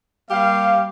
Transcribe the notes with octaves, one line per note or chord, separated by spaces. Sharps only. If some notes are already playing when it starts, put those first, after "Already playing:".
G3 A#3 G4 F5